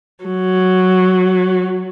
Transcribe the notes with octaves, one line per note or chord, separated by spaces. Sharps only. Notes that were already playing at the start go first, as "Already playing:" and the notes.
F#3